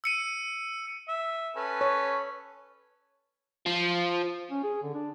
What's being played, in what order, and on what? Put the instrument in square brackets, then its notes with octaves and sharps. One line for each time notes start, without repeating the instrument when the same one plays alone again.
[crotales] E6 C#7 D#7
[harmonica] E5
C#4 A4 B4
[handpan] C#5
[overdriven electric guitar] F3
[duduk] C#4
G#4
D3
D4